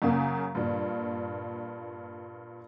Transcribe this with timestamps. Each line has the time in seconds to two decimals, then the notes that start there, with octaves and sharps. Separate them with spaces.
0.02 F#2 C#3 A#3
0.55 G2 A#2